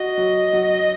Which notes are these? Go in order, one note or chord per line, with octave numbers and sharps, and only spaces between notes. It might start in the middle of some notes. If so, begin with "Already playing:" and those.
Already playing: F#4 D#5
F#3
F#3